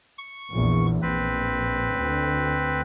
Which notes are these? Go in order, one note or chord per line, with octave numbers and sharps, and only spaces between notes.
C#6
A#1 E2
A#1 C4 B4
D2